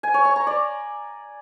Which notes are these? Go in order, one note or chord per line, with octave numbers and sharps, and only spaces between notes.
G#5
C#5
C#6
A#5
D5